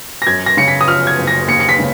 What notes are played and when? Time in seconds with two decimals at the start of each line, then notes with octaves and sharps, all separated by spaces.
0.22 A#6
0.27 F#2 G#6
0.46 A#6
0.57 C#3 C#7
0.68 B6
0.81 D#6
0.87 F3 F6
1.07 G#6
1.18 F#1
1.27 A#6
1.47 D#2 C#7
1.60 C#7
1.69 B6
1.79 C#3